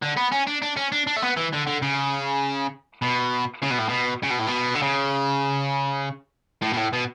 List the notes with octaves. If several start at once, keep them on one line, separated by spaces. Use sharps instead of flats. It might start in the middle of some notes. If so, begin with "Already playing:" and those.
D3
B3
C#4
D4
D4
C#4
D4
D4
A3
B3
E3
D3
D3
C#3
B2
C#3
B2
A2
B2
C#3
B2
A2
B2
D3
C#3
A2
B2
A2
B2